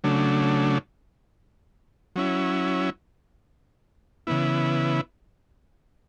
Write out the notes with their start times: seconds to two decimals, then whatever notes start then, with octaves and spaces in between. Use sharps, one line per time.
0.04 C#3 F#3 A3 D4
2.16 F#3 C#4 E4
4.27 C#3 E3 B3 E4